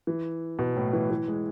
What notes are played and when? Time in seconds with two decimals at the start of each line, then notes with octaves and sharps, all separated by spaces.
0.07 E3
0.59 B2
0.77 A2
0.93 E3
1.11 E3
1.28 G#3